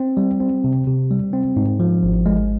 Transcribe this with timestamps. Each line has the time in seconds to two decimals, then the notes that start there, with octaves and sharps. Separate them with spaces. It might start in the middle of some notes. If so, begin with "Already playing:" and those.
Already playing: C4
0.17 G3
0.40 C4
0.64 C3
0.87 C3
1.11 G3
1.33 C4
1.56 G#2
1.80 F3
2.03 G#1
2.26 G#3